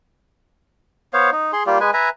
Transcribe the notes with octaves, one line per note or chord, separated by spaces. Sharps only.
B3 C5 C#5 F5
D#4
G#4 C6
G3 A#3 F4 G4
G#3 B4 G#5
B4 E5 G#5 A#5